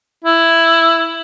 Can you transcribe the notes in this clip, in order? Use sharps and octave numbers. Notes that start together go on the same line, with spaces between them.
E4